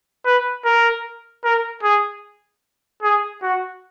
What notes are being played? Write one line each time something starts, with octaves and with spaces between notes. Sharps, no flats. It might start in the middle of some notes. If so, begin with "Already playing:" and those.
B4
A#4
A#4
G#4
G#4
F#4